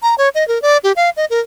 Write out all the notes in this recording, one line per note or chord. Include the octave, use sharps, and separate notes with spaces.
A#5
C#5
D#5
A#4
D5
G4
F5
D#5
A#4